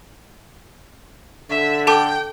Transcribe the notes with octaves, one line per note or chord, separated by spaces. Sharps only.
D3 E5
A4 G5 A5 D6